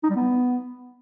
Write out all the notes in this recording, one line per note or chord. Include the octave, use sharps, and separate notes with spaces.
D#4
G3
B3